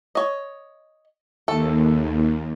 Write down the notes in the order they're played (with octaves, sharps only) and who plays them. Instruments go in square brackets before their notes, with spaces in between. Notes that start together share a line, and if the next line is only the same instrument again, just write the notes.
[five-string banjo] C#5 D#5
[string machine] D#2 [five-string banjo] A3 A4